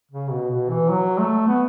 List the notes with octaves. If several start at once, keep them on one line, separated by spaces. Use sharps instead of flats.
C#3
B2
B2
E3
F#3
A3
B3